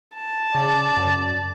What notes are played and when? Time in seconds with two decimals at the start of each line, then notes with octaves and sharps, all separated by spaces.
0.16 A5
0.55 C#3 D5
0.97 F#2